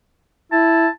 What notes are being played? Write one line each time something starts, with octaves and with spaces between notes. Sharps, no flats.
E4 A5